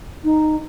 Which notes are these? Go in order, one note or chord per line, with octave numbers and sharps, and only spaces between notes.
D#4